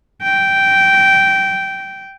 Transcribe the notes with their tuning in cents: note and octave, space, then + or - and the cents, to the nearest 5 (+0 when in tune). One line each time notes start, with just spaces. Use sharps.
G5 -10